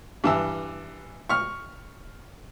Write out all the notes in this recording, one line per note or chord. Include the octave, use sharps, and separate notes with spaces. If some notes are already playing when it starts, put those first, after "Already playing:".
G2 E3 E6
C#6 F6